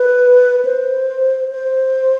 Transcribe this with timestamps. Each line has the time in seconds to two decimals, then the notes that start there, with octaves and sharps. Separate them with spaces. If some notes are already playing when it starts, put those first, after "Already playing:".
Already playing: B4
0.65 C5
1.52 C5